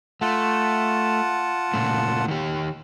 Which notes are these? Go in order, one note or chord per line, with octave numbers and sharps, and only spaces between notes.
A3 F4 F#5 A5
A#2 C#3 A3
D#3 G4